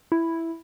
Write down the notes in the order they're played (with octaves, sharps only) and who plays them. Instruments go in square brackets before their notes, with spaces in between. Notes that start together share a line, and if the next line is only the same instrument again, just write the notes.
[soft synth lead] E4